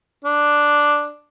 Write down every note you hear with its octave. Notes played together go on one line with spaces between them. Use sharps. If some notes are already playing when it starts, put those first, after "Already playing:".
D4